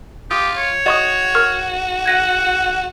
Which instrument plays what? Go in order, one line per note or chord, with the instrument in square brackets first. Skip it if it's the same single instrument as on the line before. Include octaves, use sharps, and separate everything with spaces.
[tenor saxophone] F4 [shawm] G4 [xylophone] D#6
[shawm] C#5
[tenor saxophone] F#4 [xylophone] D#5 C#6 D#6
[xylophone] A#4 C#6 F6
[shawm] F#5 [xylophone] G#6 A#6 D#7